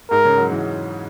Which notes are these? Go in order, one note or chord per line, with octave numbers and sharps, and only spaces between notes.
G#2 A#4
C#3
F#3
E3